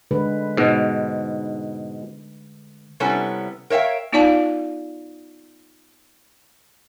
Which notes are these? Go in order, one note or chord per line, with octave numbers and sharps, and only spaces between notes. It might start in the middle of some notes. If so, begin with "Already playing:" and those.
D3 G#3 B4
G#2 B2
C3 G3 B3 C#4 E4 A4
A#4 C#5 E5 F5 G5
B3 D#4 F4 D5 F5 A5